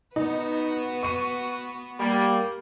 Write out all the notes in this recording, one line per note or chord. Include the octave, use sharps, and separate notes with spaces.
B3 D#4 F#4 B4
C#6 D#7
G3 A#3